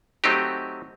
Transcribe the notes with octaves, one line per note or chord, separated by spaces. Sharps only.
F#3 A3 C4 D#4 G4